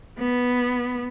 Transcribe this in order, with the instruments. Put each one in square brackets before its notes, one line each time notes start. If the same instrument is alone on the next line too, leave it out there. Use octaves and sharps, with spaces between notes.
[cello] B3